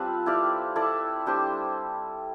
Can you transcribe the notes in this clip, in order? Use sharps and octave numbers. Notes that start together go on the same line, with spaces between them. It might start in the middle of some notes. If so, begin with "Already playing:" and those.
Already playing: G3 C4 F4 A4 B4
E4 G4 D5 F5
E4 A4 D5
G3 D4 G4 C5